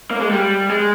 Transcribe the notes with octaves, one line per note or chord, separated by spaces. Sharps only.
A#3
G#3
G3
G#3